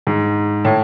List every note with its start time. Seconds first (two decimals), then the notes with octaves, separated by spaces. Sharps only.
0.07 G#2
0.65 A2